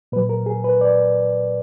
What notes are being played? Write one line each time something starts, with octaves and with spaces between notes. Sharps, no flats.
A#2 F#3 B4
A#4
G#4
B4
D5